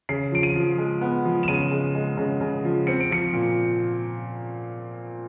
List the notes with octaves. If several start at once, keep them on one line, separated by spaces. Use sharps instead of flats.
C#3 C7
F3 D7
D#7
F3
G#3
B3
F3
E7
C#3 D#7
G#3
G#3
C#3
C#3
F3
C4 C#7
D7
F3 C#7
A#2